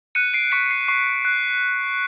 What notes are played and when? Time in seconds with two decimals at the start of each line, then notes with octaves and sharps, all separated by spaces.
0.15 F#6 C#7 D#7
0.33 C7 D7
0.52 C#6 B6 C#7
0.66 C#7
0.71 C7
0.88 C#6 C7
1.25 F#6